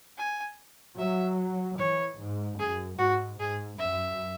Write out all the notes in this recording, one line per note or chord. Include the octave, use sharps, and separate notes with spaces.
G#5
F#3 E5
E3 C#5
G#2
F#2 G#4
G#2 F#4
G#2 G#4
F#2 E5